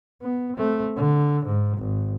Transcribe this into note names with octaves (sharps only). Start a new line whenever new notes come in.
B3
A3 C4
D3
G#2
G#1